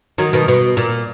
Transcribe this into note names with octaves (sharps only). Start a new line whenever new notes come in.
D#3 F#3
B2 D#3
B2
A#2